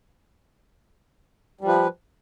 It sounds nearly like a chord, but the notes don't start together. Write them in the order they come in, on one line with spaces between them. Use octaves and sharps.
G3 F3 B4